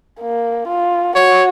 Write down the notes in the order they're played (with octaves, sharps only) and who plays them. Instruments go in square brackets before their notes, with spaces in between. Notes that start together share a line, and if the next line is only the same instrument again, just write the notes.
[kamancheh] A#3
F4
[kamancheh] F#4 [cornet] C#5